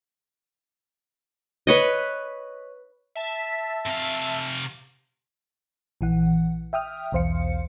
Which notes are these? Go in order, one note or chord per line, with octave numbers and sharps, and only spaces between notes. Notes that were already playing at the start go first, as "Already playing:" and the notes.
B4 C#5 D#5
E5 A5
C3 F5
A#1 E3 F#5
E5 G5 D#6 F6
B1 E2 C5 F5 C#7